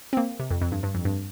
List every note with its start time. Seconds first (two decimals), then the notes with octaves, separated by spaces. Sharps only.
0.13 C4
0.17 A#3
0.39 C3
0.51 F2
0.61 F2
0.72 G2
0.83 G2
0.95 F2
1.05 G2